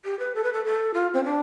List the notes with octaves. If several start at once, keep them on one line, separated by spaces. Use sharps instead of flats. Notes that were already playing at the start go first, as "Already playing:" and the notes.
G4
B4
A4
B4
A4
A4
F4
C4
D4